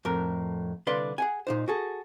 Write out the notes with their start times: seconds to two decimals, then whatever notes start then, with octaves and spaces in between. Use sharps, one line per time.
0.05 F2 A2 A#4
0.87 C2 D3 B4 D5 F5 C6
1.18 G#4 F#5 G#5
1.47 A#2 D#4 C5
1.68 F#4 G#4 A4